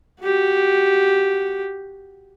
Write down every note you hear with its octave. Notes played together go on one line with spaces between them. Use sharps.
F#4 G4